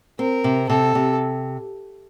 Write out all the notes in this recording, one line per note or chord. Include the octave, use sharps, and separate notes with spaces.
C4 A#4
C3
C3 A4
C3